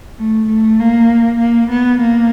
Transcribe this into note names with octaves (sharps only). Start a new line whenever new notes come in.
A3
A3
A#3
A#3
B3
A#3